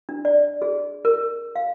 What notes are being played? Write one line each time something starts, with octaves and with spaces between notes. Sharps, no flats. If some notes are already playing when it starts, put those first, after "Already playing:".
D4
D5
G#4
A#4
F5